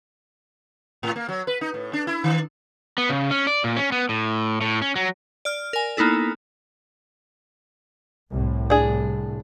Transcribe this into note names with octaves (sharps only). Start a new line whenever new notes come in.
A2
A#3
F#3
B4
D#4
A2
D4
E4
D#3
B3
C#3
C#4
D5
A#2
C#4
B3
A2
A2
C#4
F#3
D5 F6
A#4 G#5
A#3 B3 D#4 E4 A4
C2 A2
D4 G#4